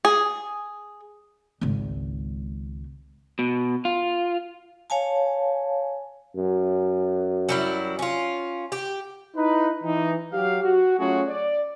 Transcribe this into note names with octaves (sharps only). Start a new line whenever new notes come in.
G#4
G#1 C#2
B2
F4
C#5 F5 G#5 A5
F#2
F#3 G3 E4
C#4 F4
G4
D#4 E4 B4
E3 D#4
F#3 G4 F5
F#4
F#3 A3 C#4 F4 F#4 G#4
D5